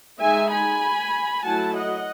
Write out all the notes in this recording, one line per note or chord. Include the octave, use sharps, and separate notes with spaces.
G#3 D#4 E5 G#5
G#5 B5
F#3 A3 E4 F#5 A5
D#5 F#5